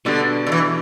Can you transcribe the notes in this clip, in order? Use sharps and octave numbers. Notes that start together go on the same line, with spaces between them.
B2 D3 G3 D4
D3
E3